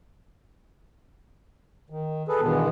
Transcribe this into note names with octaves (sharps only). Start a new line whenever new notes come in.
D#3
G#4 A4 B4
G2 B2 D#3 E3 G#3 B3